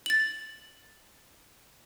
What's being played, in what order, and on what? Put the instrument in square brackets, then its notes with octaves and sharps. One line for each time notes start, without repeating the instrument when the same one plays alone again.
[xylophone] A6 F#7